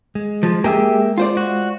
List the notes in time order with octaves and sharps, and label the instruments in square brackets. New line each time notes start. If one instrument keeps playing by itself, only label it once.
[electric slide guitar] G#3
[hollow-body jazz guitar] F3
[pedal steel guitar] A#3 E5 E6 [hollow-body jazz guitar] G4 G#4
[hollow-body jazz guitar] F4 C5 D5
[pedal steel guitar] F#4